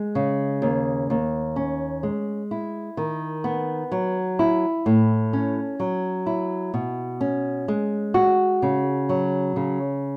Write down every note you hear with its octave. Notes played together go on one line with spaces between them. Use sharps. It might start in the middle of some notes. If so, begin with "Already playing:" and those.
Already playing: G#3
C#3
D#2
D#2
C#4
G#3
E4
D#3
B3
F#3
E4
A2
C#4
F#3
E4
B2
C#4
G#3
F#4
C#3
F#3
C#3